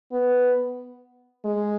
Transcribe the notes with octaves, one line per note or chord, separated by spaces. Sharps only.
B3
G#3